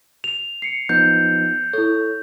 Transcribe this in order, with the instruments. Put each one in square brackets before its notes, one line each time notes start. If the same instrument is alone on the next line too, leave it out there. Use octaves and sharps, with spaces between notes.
[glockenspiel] F7
[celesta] C7 C#7
[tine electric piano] F3 B3 D#4 [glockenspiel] G6
[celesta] E4 A4 [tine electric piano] C#5